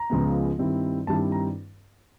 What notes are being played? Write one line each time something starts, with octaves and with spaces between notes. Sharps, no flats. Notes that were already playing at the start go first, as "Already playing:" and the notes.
Already playing: A#5
C#2 C#3 F3 G#3 B3
G2 D#3 G3 C4 E4
G2 D#3 G3 C4 E4 A5
A#5